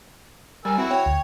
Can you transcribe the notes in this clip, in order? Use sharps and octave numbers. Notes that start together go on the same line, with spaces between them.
G3 A#4 G#5 E6
C4 E4 F#4
C#5 G5
D2